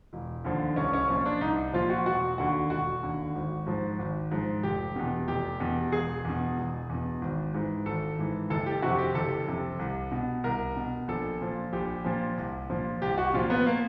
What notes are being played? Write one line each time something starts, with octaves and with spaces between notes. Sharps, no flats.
E1
D#2 D3 F3
C2 C#4
C#4
A#2 F3 C#4
D4
C2 D#4
A#2 F3 F4
F#4
E1 F#4
D#2 D3 F#4
E1 F#4
D#2 D3
G#1
G#2 F3
G#1
G#2 F3
F1 G4
E2 B2
F1 G4
E2 B2
E1 G#4
E2 B2
E1
E2 B2
G#1
G#2 E3
G#1 A4
G#2 E3
F#1 A4
G4
F2 C3 F#4
G4
F#1 A4
F2 C3
C2
B2
C2 A#4
B2
A#1 A4
A#2 F3
A#1 G4
A#2 F3
C2
A#2 F3
C2 G4
F#4
A#2 F3 F4
B3
A#3